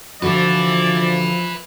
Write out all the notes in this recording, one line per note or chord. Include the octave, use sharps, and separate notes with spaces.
D3 F3 F#4 B4 D5 E5